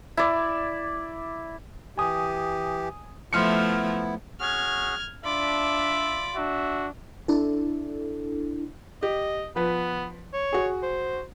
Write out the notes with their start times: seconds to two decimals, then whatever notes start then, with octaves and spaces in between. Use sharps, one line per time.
0.17 E4 D5
1.98 E3 G4 G#5 D#6
3.33 F3 A3 B3 E4 C6 F6 C#7
4.40 C#4 F#4 G#4 F6 G#6
5.25 D4 F4 D5 E5 B5 D6
6.35 D4 F#4 E5
7.28 D4 E4 A4
9.03 G4 D#5
9.56 F3 B3 B4
10.34 C#5
10.53 F#4 G#4
10.83 C5